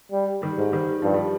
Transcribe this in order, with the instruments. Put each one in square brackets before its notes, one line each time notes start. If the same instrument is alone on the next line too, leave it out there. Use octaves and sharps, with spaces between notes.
[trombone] G3
[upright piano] D#3 G3
[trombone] G#2
[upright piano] D#3 G3
[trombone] G2 [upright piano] F3
[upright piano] G3